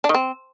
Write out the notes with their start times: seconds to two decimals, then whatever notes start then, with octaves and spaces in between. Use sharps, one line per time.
0.04 D4
0.09 D#3
0.14 C4